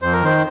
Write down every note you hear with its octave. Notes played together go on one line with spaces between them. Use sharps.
F2 C5
A#4
D#3 C5